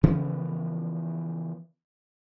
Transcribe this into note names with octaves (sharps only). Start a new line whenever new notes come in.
C#3 E3 F3 B3